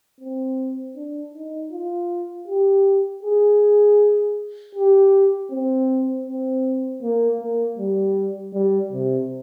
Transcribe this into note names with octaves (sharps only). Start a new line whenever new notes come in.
C4
D4
D#4
F4
G4
G#4
G4
C4
C4
A#3
A#3
G3
G3
C3